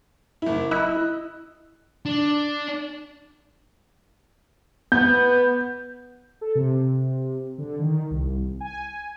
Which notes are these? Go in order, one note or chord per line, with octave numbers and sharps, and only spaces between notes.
F#1 E4
E4 D#5 E6 F#6
D4
B3 G6
A4
C3
D3
D#3
C2
G#5